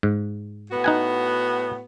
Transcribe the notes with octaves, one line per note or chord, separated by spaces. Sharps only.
G#2
A2 B3 F#4
D#4 F#5 G#5